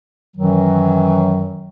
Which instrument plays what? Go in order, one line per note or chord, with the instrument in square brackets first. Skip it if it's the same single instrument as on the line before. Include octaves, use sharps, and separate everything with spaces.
[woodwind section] F#2 D#3 E3 F#3